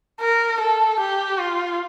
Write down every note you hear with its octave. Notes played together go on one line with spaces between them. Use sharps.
A#4
A4
G4
F4